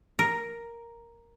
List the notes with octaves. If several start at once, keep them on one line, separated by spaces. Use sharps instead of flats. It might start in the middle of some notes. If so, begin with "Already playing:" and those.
A#4